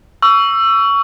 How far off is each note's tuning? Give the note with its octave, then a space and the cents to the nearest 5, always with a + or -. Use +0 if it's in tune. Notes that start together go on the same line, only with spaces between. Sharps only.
C#6 +25 E6 +20